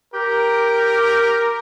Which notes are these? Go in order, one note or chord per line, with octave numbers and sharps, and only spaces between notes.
G4 A#4